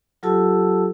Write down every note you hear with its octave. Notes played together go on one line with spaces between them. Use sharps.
F#3 F4 G4 A4 A5 E6